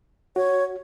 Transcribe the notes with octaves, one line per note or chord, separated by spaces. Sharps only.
F#4 C#5